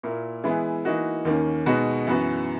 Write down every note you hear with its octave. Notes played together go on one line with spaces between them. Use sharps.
A#2 A#3 E4 A#4
E3 G#3 B3 E4
E3 A#3 D#4 F#4
D#2 D#3 A#3 C#4
B2 G#3 B3 D#4 F#4
F#2 E3 B3 F#4